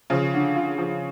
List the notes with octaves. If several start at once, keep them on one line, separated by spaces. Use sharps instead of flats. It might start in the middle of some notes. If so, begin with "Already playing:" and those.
C#3 F3
D3
F4
F3